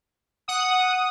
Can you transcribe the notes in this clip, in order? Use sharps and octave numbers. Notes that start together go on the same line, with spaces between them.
F#5 D#6